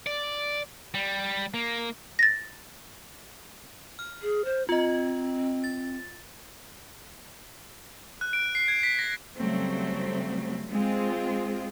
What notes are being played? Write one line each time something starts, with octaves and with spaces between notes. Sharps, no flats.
D5
G3
A#3
A6 A#6
F6
G#4
C5
C4 F4 D#5
A6
F#6
D7
C7
G#6
B6
A#6
C#3 F#3 G3 A3 C4
G#3 C4 F4 G#4